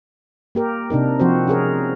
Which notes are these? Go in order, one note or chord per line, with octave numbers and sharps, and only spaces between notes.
A#3 G4 A#4
C3 D4 D#4 A#4
F3 C4 F#4 C5
C#4 G#4 A#4